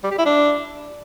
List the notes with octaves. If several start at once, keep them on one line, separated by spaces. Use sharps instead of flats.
G3
G4
E4
D4